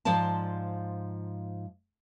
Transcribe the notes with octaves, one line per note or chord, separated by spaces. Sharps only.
G#2 F3 C5 D5 A5